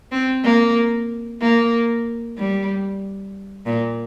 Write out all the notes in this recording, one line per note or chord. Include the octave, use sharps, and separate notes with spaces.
C4
A#3
A#3
G3
A#2